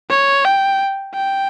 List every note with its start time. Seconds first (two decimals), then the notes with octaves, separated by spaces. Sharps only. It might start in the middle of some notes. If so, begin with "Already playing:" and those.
0.10 C#5
0.45 G5
1.15 G5